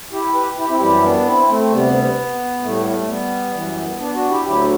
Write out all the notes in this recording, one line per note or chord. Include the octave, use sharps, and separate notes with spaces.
E4 G4
G4 B4
E4 G4
C4 E4
F#2 E3 G3 E4 G4
B3 D4
C4 E4
A3 C4
D2 C3 G3 B3
A2 G3 A3
B3
A3
G3 B3
F#2 E3 G3
B3 D4
D4 F#4
E4 G4
D2 D3 F#3 E4 G4